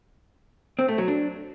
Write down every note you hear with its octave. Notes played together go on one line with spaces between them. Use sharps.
C4
A3
F#3
D4